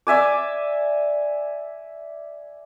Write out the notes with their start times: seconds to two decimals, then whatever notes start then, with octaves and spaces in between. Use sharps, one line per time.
0.07 D5 E5 G#5 D6